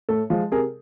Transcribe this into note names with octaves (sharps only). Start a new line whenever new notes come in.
A2 A4
F3 G#3
C3 G#4 A#4